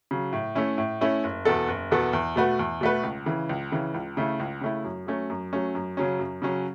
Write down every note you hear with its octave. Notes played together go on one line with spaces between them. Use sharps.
C#3 F#3
A2
A3 C#4 E4
A2
A3 C#4 E4
F#1
E2 B2 B3 A4
F#1
E2 B2 B3 A4
E2
B2 A3 F#4 B4
E2
B2 A3 F#4 B4
C#2
C#3 E3
C#2
C#3 E3
C#2
C#3 A3 E4
C#2
C#3 A3 E4
F#2
F#3 A3 C#4
F#2
F#3 A3 C#4
F#2
C#3 F#3 C#4
F#2
C#3 F#3 C#4